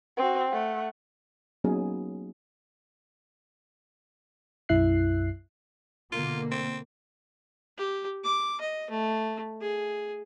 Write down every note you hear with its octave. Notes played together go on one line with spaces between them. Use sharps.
C4 F#4
A3 F#5
F#3 A#3 B3 C#4 D#4 G#4
B1 F#2 E4 E5 F#6 C7
B2 D3 A#3 F4
C4
G4
D6
D#5
A3
G#4